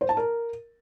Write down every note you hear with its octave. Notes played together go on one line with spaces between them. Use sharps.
C5
A5
A#4